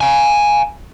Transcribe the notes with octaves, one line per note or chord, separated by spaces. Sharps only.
F5 G#5